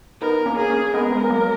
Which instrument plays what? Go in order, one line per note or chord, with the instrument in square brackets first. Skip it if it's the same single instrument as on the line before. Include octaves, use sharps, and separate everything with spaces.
[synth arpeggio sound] B3 D#4 [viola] A#4
[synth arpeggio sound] A#3 C#4
[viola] G#4
[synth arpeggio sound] A#3 C#4
[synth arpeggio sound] G#3 B3 [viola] A#4
[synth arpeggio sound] G#3 B3
F#3 A#3